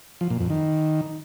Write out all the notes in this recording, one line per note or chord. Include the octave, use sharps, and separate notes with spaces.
F3
A#2
F2
D#3